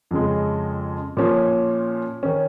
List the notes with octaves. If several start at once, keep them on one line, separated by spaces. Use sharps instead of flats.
F2 C#3 G#3
A#2 F3 C#4
D#3 C#4